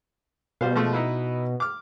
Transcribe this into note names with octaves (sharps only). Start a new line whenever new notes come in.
B2 G3 C5 F5
F3 G#3 A3
D#4 E4 B4
D6 F6